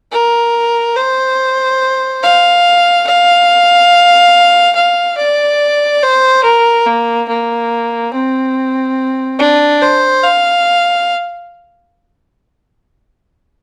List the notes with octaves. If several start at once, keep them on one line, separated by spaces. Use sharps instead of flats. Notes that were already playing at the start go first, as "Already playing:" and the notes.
A#4
C5
F5
F5
F5
D5
C5
A#4
A#3
A#3
C4
D4
C5
F5